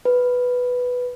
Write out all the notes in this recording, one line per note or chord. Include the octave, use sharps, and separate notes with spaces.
B4